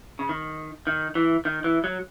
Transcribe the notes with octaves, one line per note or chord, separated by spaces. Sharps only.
C#3
D#3
D#3
E3
D#3
E3
F#3